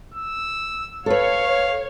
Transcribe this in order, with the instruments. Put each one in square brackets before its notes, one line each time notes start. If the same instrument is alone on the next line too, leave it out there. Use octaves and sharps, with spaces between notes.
[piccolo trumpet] E6
[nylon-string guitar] A4 B4 [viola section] C#5 [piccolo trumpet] F5